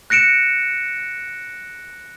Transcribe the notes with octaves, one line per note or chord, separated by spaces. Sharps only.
F#6 A#6 C#7 D7 E7